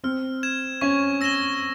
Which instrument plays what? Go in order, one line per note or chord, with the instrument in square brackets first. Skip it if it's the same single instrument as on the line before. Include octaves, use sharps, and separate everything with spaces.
[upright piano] C4 [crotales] F6
[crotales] G#6 E7
[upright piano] C#4 [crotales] C#6
[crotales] E6 A#6 E7 G7